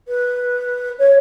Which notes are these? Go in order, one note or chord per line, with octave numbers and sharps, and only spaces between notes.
B4
C#5